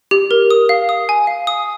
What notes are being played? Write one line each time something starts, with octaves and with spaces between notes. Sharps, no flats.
G4
A#4
D#6
F5
D#6
G#5
F5
D#6